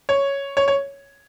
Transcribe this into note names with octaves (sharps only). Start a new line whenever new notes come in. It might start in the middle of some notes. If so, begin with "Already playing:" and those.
C#5
C#5
C#5